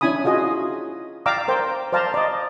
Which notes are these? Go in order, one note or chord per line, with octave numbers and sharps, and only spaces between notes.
C#4 D4 E4 G#5 B5 D#6
F4 F#4 G#4 D#5
D5 F5 G5 A#5 D6 E6
A#4 C5 G5
C5 D5 F5 A5 A#5 C6
D5 D#5